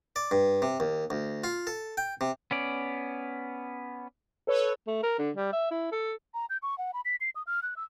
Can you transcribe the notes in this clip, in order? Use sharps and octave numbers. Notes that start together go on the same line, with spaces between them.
D5
G2
C3
D#2
D2
F4
A4
G5
C3
B3 C#4 D5
A4 B4 C#5
A3
A#4
D3
G3
E5
E4
A4
A#5
G6
C#6
F#5
B5
B6
C7
D#6
F6
F#6
E6